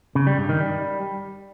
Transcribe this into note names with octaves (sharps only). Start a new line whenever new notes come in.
C#3
G3
G2
D#3
G3